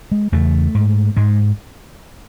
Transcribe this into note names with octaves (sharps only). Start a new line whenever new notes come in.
G#3
E2 C#3 A3
G#2
G#2 G#3